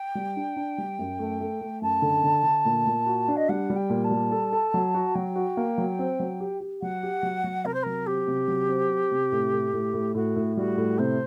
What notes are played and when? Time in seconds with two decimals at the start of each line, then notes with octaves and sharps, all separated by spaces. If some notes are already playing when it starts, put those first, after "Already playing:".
Already playing: G5
0.15 G3
0.36 D4
0.56 D4
0.78 G3
0.99 F#2
1.19 A3
1.40 A3
1.61 A3
1.82 F#2 A5
2.02 D3
2.24 D3
2.44 D3
2.65 A#2
2.86 A#2
3.06 F#4
3.28 D4
3.36 D#5
3.49 G3 F#5
3.70 G3
3.76 G5
3.90 A#2
4.04 A5
4.11 G3
4.31 A4
4.52 A4
4.74 F#3
4.94 F#4
5.15 F#3 G5
5.36 F#4
5.57 A#3
5.78 F#3
5.99 C4
6.20 F#3
6.40 G4
6.60 G4
6.82 F#3 F#5
7.03 G4
7.23 F#3
7.44 F#3
7.65 C3 A#4
7.74 C5
7.83 F#3 A#4
8.07 C4 G4
8.27 C3
8.48 F#3
8.69 C4
8.90 C4
9.11 C3
9.32 A2
9.53 A2
9.73 A2
9.94 A2
10.15 A2 F#4
10.36 A2
10.57 G3 F#4
10.77 A2
10.99 C3 C5